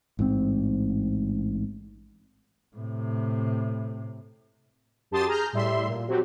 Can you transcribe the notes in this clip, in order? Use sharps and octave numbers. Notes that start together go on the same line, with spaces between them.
A1 G#2 B2 C4
A2 C3
F#2 G4 A5 C6 D#6 A6
G#4 A#5 F6 G6
A2 G3 E5 C6
A#2
F#3 C4 F#4 G4